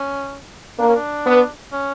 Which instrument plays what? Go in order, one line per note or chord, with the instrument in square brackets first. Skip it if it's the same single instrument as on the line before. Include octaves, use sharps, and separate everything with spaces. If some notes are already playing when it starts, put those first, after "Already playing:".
Already playing: [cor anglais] C#4
[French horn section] A#3 [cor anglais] D4
[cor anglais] C#4
D4
[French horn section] B3
[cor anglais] C#4